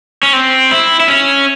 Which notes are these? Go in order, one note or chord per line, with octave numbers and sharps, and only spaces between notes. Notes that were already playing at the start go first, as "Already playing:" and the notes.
C#4
C4
E4
E4
C#4